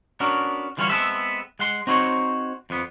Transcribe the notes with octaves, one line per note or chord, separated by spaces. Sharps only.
B3 C#4 D4 F#4 A#4
D3 E3 G3 F4 F#4 C#5
G#3 B3 C4 A4 E5
G#3 F#5 C6
C4 D#4 F#4 C5 C#5
F2 B3